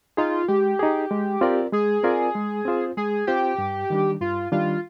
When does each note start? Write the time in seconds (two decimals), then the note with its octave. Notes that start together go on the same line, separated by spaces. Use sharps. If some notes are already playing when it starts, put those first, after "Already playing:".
0.17 D#4 F4 G#4
0.48 G#3 G4
0.79 D#4 G#4
1.11 G#3
1.41 C4 F4 A#4 D5
1.73 G#3 G#4
2.03 C4 F4 A#4 D5
2.35 G#3
2.65 C4 F4 C5
2.97 G#3 G#4
3.27 C4 F4 G4 C5
3.58 G2
3.90 D#3 G3 D4
4.21 G2 F4
4.52 D#3 G3 D4 F4